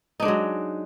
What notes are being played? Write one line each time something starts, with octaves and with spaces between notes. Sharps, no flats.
F#3 G#3 D4 D#4